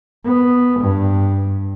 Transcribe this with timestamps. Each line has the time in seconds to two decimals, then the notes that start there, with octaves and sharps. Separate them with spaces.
0.25 B3
0.80 G2